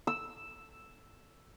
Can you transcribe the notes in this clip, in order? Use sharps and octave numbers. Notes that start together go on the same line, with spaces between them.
E6